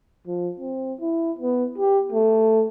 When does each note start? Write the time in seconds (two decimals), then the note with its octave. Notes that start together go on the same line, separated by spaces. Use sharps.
0.27 F3
0.60 C4
1.00 E4
1.39 B3
1.78 G4
2.12 A3